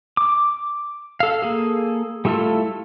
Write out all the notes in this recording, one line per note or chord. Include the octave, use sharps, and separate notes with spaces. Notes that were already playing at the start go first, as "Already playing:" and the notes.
D6
A4 F5
A#3 G#4 A4
G3 A3 E4 F4 A4